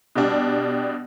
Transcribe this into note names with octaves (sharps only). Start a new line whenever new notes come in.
B2 G3 D4